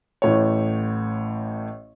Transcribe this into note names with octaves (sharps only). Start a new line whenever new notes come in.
A1 A2 C#5